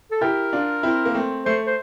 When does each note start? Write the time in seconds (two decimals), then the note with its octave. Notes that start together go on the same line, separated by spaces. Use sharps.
0.11 A4
0.21 E4 G4 A#4
0.53 D4 F4
0.83 C4 E4
1.06 A#3
1.15 A3 C4
1.46 A3 C5
1.67 C5